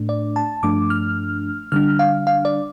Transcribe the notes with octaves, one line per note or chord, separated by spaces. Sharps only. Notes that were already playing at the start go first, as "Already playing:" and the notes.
Already playing: A2 A3 D4
D5
A5
G2 F3 A3 D4 D6
F6
D3 G3 D4 F6
F5
F5
D5